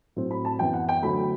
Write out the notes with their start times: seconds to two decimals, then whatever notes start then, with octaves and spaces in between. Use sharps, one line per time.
0.16 A2 F#3 C4
0.31 B5
0.45 A5
0.59 F#2 E3 B3 G5
0.73 F#5
0.89 G5
1.03 D2 D3 F#3 A3 B5